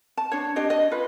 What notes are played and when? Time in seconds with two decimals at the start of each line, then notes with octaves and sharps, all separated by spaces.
0.17 A5
0.32 D4 C#5
0.56 D4 G4 D#5
0.70 D#5
0.91 F4 B4